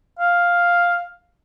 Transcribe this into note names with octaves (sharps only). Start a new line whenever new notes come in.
F5